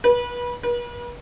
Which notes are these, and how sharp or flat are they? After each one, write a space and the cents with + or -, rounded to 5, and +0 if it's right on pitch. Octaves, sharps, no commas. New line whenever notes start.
B4 -25
B4 -40